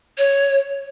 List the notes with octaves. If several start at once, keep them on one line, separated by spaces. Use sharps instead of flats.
C#5